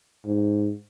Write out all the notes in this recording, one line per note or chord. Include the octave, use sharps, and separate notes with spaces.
G#2